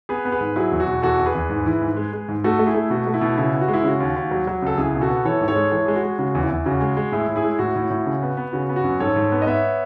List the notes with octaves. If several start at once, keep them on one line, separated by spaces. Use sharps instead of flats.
B3 G#4 B4
B3
G#4 B4
G#2
F#3 E4 G#4
E2
F#4
B2
E2 F#4 A4
E2
G#4 B4
E2
G#2
E3
G#2
G#3
G#3
G#2
A3 F#4 A4
A3
E4 G#4
A3
B2 F#4
A3
E4
B2
C#3 E4
B3
F#4
G#3
E4
C#3 F#4
D#2
D#2
F#3
F#3
C#2 A4
C#2 E4 G#4
B2
F#4 A4
B3
E3 A4 C#5
G#2
A4 C#5
G#3
E3 A4 C#5
G#3 G#4
F#4
G#3
C#3 F#4
E2
E4
E2
C#3 F#4
G#3
G#3
A2 E4 G#4
A2
E4 G#4
G#3
A2 F#4
A2
A2
C#3
B3
B3
C#3 F#4
B3
F#4
F#2
G#2 A4 C#5
G#2
B3
D#5
B3 C#5 E5